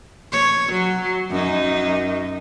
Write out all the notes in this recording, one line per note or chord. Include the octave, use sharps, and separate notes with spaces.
C#5
F#3
F#2 D#4